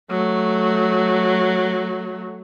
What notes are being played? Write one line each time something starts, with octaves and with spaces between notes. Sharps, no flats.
F#3 A3